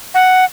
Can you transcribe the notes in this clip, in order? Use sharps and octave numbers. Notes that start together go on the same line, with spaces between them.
F#5